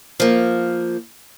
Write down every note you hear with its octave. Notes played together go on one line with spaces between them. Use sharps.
F3 A#3